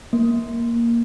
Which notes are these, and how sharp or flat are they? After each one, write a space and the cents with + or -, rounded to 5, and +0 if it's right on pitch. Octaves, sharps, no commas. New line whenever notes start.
A#3 +0